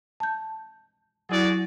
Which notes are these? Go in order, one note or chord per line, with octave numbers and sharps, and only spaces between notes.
A5 G6
F#3 E4 F#4 G#4 D5